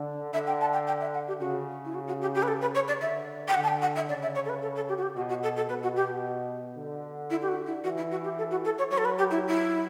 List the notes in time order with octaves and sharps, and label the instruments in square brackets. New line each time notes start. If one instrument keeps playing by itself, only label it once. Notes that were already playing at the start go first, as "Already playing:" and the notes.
Already playing: [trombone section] D3
[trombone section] D3 [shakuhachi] E5
[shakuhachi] G5
A5
G5
G5
E5
F#5
G4
[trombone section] C#3 [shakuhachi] F#4
[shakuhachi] E4
F#4
F#4
G4
G4
B4
A4
B4
C#5
D5
[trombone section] D3 [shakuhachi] E5
[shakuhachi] G5
[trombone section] D3 [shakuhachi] F#5
[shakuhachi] A5
G5
F#5
E5
[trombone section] C#3 [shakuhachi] D5
[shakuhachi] E5
C#5
A4
B4
A4
A4
G4
F#4
G4
[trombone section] B2 [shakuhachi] F#4
[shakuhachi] F#4
A4
A4
[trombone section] B2 [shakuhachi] B4
[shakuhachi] F#4
G4
[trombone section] D3
[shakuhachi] E4
G4
F#4
E4
[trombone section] E3 [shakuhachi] F#4
[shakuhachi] E4
F#4
G4
A4
F#4
A4
C#5
[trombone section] F#3 [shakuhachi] C#5
[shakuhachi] A4
B4
G4
E4
E4